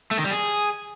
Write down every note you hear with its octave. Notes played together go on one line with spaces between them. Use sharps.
A3
D#3
G3
G#4